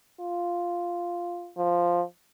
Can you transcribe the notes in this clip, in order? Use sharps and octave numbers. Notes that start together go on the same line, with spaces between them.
F4
F3